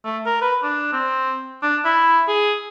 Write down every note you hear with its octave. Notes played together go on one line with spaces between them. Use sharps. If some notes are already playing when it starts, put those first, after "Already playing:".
A3
A#4
B4
D4
C4
D4
E4
G#4